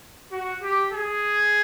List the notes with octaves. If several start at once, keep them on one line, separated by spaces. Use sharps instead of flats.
F#4
G4
G#4